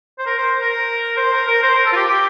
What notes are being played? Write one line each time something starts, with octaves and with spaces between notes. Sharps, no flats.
C5
A#4
C5
A#4
C5
A#4
A#4
C5
A#4
A4
F4
G4
G4